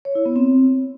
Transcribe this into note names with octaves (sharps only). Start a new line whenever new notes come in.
C#5
E4
B3
C4